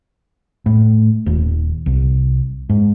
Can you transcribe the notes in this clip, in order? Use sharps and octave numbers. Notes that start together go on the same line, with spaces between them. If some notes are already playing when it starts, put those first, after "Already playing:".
A2
D#1
C2
G#2